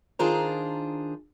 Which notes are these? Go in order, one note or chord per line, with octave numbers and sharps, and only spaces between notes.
D#3 D4 F4 G#4 C5 A#5